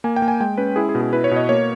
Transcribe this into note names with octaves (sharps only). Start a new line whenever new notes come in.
A#3 G#5
G5
A#3
G#5
G#3 G5
C#4 B4
E4 G#4
G#4
B2
G#4
E4 B4
C#5
B2 D#5
A#3 C#5